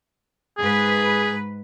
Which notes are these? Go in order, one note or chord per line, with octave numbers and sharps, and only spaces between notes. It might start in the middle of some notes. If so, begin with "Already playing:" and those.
G#2 G#4 B4